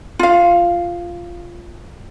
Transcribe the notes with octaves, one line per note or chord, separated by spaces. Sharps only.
F4 F5